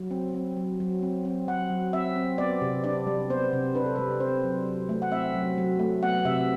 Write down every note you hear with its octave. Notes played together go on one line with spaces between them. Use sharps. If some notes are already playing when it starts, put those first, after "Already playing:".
Already playing: F#3
C4
C4
F#3
F#3
C4
C4
F#3 F#5
F#3
C4 E5
C4
B3 D5
C3
D4 D5
G3
B3 C5
C3
D4 B4
A4
G3 B4
C4 C5
F#3
F#3
A3
F#5
C4 E5
F#3
F#3
A3
B3 F#5
C3 E5